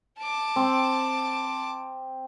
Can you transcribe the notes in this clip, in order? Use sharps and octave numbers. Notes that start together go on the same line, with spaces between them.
A5 D6
C4